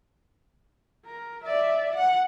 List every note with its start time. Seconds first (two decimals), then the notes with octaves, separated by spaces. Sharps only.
1.05 A#4
1.43 D5 E5
1.95 F#5